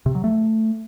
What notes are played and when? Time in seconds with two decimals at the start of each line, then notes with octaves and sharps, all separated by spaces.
0.06 C3
0.15 F#3
0.24 A3